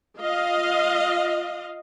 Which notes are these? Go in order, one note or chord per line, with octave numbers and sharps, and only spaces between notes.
F4 D#5 F5